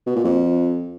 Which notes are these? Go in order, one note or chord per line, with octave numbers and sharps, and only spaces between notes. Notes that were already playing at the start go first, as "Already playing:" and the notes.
B2
A#2
F2